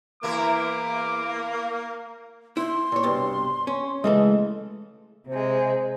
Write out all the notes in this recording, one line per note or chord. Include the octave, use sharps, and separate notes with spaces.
E2 A#3 E4 A#4 D6
E4 C6
A#2 C#5
C2 G2 B2
C#4
C#3 E3 G#3 A3 A4 D#5
C3 G#3 C5